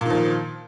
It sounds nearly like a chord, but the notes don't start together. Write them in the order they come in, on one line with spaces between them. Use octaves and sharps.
A#2 D#3 F3